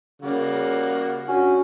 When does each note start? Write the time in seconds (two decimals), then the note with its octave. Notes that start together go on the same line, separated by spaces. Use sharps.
0.22 C#3 G3 A#3 F#4
1.28 C#4 D4 F#4